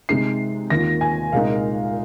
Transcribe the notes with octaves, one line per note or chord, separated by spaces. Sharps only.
C3 G#3 D#4 C7
D#2 D#3 A#3 F4 A#6
G#5
C2 A#2 G#3 D#4 F5